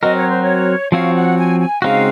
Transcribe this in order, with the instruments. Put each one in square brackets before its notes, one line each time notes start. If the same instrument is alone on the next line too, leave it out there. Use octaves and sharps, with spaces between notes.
[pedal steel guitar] F#3 C4 F#4 A#4 [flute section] D#5
[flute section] C#5
C5
C#5
[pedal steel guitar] F3 C4 F#4 C#5 [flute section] F5
[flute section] F#5
G#5
G#5
[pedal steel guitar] C#3 G#3 C4 D#4 F#4 [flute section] F5